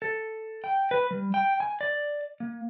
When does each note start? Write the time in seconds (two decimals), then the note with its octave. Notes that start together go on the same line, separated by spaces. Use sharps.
0.02 A4
0.64 G5
0.91 B4
1.11 G3
1.34 G5
1.60 G#5
1.81 D5
2.40 A#3